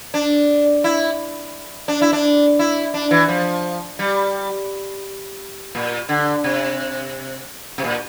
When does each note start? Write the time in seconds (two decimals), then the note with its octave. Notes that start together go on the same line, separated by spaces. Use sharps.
0.14 D4
0.84 E4
1.88 D4
2.02 E4
2.13 D4
2.59 E4
2.94 D4
3.11 E3
3.28 F3
3.99 G3
5.75 A#2
6.09 D3
6.44 C3
7.78 C3
7.84 A#2